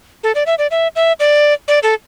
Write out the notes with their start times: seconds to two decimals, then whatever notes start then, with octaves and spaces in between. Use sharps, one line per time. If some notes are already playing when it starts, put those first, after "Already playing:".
0.23 A4
0.35 D5
0.46 E5
0.59 D5
0.71 E5
0.96 E5
1.20 D5
1.68 D5
1.83 A4